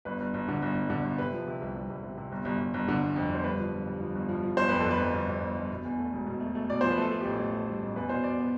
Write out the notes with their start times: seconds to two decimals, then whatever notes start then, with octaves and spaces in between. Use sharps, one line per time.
0.05 G1 B4
0.20 G1
0.34 G1
0.48 D3
0.62 G1
0.76 G1
0.90 D3
1.04 G1
1.18 C3 B4
1.33 F3
1.47 C3
1.62 C2
1.75 C2
1.90 C2
2.03 C3
2.18 C3
2.32 G1
2.45 G1
2.59 G1
2.74 G1
2.88 D3
3.03 G1
3.16 F2
3.30 G1 C5
3.44 G2 B4
3.59 F3
3.73 F3
3.87 G2
4.00 F3
4.15 G1
4.29 F3
4.43 F3
4.57 G1 C5
4.69 F2 B4
4.80 G1 A4
4.90 B4
5.00 F2
5.13 G1
5.27 G1
5.42 G1
5.56 G1
5.70 B2
5.85 E2
5.99 A3
6.13 E1
6.27 B2
6.40 A3
6.55 A3
6.69 B2 D5
6.81 F3 C5
6.91 B4
6.98 A3 A4
7.12 A3
7.21 A1 G4
7.39 A1
7.53 A3
7.68 G2
7.82 A1
7.96 E2 B4
8.09 B2 C5
8.23 B2 D5
8.39 B3